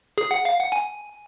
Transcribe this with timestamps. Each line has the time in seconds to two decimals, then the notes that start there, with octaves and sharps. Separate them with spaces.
0.18 G#4
0.31 F#5
0.45 F5
0.59 F#5
0.72 G#5